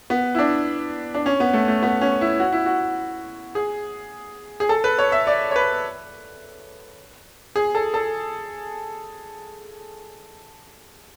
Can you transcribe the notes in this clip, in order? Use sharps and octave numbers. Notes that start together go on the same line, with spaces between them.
B3
E4
D4
D4
C#4
B3
A3
A3
B3
C#4
E4
F#4
E4
F#4
G#4
G#4
A4
B4
C#5
E5
D5
C#5
B4
G#4
A4
A4